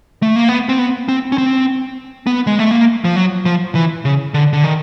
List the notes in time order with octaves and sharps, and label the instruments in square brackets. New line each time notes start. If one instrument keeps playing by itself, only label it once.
[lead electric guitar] A3
A#3
B3
C4
B3
C4
C#4
C4
B3
G#3
A3
A#3
F3
F#3
F3
E3
C#3
D3
D3
D#3